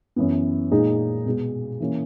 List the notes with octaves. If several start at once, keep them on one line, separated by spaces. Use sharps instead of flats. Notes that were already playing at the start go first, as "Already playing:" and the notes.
F#2 E3 B3
A#2 G#3 D#4 G#4
B2 G#3 B3
E3 A#3 C#4